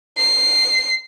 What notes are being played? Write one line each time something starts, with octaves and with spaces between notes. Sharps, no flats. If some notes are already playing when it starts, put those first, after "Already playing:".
C7